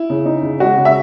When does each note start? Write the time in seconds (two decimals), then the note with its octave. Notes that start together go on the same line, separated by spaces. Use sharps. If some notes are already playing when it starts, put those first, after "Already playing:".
Already playing: E4
0.10 C#3
0.26 D#4
0.43 C#3
0.60 G#3 F#4
0.77 C#3
0.85 E5